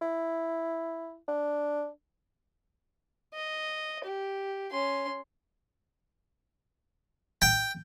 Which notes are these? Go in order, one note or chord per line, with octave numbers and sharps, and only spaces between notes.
E4
D4
D#5
G4
C#4 C6
G5